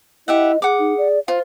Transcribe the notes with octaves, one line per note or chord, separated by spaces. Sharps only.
E4 G4 D#5 E5 F#5
G#4 F#5 D6
D#4
D5
F4 C5 F5